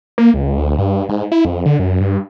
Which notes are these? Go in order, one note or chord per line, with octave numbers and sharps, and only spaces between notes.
A#3
C#2
D2
G2
G#2
E4
F2
D3
F#2
G2